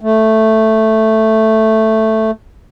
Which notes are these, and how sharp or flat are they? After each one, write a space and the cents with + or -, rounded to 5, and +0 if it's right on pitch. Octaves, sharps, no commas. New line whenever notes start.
A3 +0